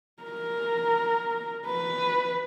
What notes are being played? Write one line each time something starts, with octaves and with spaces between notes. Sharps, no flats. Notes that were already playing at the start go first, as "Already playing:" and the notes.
A#4
B4